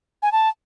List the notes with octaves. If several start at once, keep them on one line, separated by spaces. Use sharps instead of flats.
G#5
A5